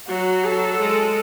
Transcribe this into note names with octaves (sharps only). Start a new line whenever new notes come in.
F#3 F#4
A4
G#3